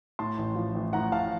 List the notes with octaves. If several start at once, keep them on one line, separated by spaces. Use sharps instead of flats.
A2 A5 C6
A1
F3
A1
A2 F#5 A#5
A1 F5 A5